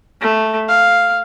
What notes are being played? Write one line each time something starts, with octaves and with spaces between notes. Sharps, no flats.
A3
F5